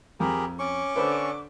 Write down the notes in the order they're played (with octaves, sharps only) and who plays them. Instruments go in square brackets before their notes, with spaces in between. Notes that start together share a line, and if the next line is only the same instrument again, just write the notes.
[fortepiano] F2 [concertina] G4 G#4 A#4 [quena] B5
[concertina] C#4 C#6 [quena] D6
[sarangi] D3 [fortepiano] B4 C5 B5